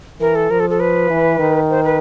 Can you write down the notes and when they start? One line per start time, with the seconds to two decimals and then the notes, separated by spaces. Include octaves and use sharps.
0.20 E3 A#4
0.35 A4
0.50 F3 A#4
0.60 A4
0.70 A4
0.80 B4
1.10 E3
1.39 D#3
1.70 C5
1.84 B4